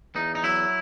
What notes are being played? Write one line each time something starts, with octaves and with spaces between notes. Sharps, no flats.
E2 D#4
D#4
F#3 E4